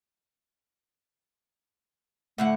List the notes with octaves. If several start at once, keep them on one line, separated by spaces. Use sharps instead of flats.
A2 D3 A3 F#5